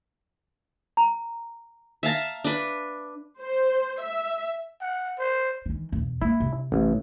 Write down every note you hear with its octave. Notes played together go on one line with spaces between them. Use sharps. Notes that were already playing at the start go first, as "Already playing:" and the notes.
A#5
E5 F5 A5 A#5
D4 B4
C5
E5
F#5
C5
D#3 E3
E2 B2
A#3 E4
C3
A1